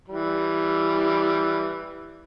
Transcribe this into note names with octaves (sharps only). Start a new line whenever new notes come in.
E3 G3